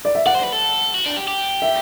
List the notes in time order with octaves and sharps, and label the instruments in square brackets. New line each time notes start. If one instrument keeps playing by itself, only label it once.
[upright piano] D5
E5
[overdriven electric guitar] D5 [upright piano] F#5
[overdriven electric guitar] C5
B4
A4
F#4
D4
G4
G4
[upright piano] E5